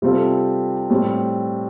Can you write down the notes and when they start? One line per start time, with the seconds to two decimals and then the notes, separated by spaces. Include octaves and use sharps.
0.02 C3 G3 C4 F4 A4
0.90 A2 G3 C4